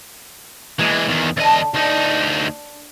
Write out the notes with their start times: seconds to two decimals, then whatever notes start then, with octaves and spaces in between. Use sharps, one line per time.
0.79 E3 G#3 A#3
1.08 E2 D#3
1.37 E2 D3 D#5 A5
1.74 D2 D4 D#4